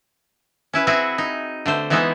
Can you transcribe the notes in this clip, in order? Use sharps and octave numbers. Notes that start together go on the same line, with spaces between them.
C#4 E4 B4
C4 E4 F#4 G#4 G#5
D#4
D3 A3 C5
E3 G#3 B3 D#4 E4